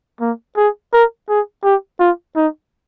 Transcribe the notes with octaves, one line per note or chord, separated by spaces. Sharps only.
A#3
G#4
A#4
G#4
G4
F4
D#4